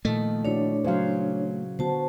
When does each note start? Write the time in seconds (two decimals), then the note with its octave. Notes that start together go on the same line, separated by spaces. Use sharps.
0.05 A#2 D#3 F3 A3 D#5
0.45 D4 E4 F#4 C#5 D5
0.84 C#3 F#3 C5 F5
1.79 D3 B3 F#4 C5 A5